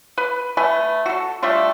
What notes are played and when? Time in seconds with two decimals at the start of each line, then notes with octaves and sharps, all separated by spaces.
0.18 B4
0.57 A3 B4 G#5
1.06 F#4 A4
1.42 G3 A3 D4 F4